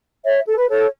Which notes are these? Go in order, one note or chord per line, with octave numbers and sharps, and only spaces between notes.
C#5 E5
A4
B4
A4 C#5